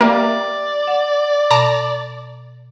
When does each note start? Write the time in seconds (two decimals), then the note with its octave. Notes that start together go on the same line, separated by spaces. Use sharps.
0.01 A#3 G4 D5 E5 G5
0.87 F#5
1.50 B2 A5 A#5 D6